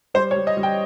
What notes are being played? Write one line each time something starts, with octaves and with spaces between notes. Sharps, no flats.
G3 C5
C#5
G3
D#5
G3
G5